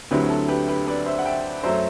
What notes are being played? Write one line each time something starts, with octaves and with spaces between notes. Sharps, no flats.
D2 D3 F#3 C4 E4 G4 B4
A4
G4 B4
G4 B4
B4 D5
C5 E5
F#5
E5 G5
F#2 F#3 A3 C5 E5